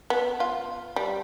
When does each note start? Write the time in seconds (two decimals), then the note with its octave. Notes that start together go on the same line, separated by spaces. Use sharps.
0.10 B3
0.40 F4
0.96 G3